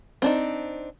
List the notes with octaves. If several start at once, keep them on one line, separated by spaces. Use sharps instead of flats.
C4 D4 D#4